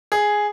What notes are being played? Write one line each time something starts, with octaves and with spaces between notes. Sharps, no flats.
G#4